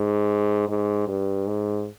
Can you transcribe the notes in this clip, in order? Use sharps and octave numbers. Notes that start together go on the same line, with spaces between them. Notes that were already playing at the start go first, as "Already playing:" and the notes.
Already playing: G#2
G#2
G2
G#2